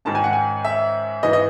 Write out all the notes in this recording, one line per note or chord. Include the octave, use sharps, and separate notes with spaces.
G#2 D#3 G#3 C#4 A5
G#5
F#5
G#5
E5
G#2 E3 B3 D#5
D#5